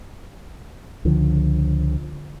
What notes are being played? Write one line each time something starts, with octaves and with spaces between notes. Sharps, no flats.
C#2 D3 F3